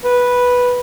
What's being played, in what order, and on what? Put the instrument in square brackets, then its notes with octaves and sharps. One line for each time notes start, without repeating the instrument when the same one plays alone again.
[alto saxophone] B4